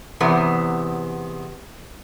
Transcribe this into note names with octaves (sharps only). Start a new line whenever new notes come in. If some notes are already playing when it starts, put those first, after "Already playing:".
E2 C3 B3